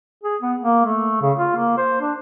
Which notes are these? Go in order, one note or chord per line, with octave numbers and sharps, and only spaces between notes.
G#4
B3
A#3
A3
C#3
F4
A#3
C5
D4